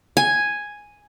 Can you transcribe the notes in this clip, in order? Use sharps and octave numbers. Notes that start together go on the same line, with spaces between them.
G#5